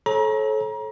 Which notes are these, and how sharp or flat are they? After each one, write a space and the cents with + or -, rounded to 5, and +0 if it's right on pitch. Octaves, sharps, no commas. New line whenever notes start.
A4 -25 C#5 -35 A#5 +30